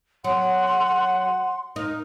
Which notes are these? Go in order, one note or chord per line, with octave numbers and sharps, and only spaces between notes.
F#3 F#5 C6
D#4 A#4